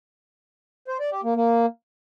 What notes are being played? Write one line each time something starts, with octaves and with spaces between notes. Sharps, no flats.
C5
D5
G4
A#3
A#3